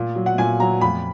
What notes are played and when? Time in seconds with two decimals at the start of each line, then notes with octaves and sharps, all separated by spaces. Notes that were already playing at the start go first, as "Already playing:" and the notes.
Already playing: A#2
0.16 F#3
0.26 F#5
0.38 A#2 G#5
0.60 F#3 A#5
0.81 F2 B5